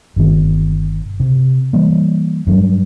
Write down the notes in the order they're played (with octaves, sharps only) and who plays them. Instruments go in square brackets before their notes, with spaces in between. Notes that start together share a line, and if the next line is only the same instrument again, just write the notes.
[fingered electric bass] G1 B2 D#3
C3
E3 G3 A#3
G2 F#3 G3